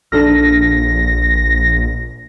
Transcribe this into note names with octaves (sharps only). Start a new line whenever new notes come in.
A#1 D4 A4 F6 A#6